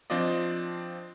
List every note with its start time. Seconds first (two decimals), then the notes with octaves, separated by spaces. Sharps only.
0.10 F3 C4 D4 F4 D5 D#5